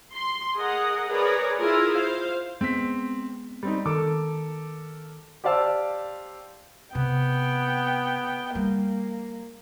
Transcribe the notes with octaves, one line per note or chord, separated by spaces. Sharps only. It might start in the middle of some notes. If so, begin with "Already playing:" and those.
C6
G#4 A#4 D#5 F#5
G#4 A#4 B4 C#5 D5
E4 F4 G#4 A#4
C5 F5
G#3 B3 C4 B6
G3 C4 D#4
D#3 A4 A#4 D6
G4 C5 D5 F5 A5 E6
C3 B3 G5
G3 A#3